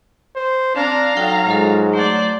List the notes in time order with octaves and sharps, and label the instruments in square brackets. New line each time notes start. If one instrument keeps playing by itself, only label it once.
[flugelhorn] C5
[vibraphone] C4 [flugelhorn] D4 [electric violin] F5 A#5
[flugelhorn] F#3 [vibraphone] D#4 A4 G5
[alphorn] G#2 [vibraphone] G#3 F4 A4
[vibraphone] A3 [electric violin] C5 D5